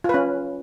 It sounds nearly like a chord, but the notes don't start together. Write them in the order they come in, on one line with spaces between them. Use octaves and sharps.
F4 B4 C#4